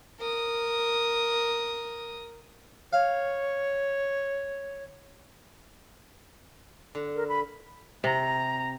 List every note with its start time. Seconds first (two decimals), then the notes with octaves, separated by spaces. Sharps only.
0.20 A#4 D#6
2.93 C#5 F5
6.95 D3
7.16 A#4
7.28 B5
8.04 C3 A#5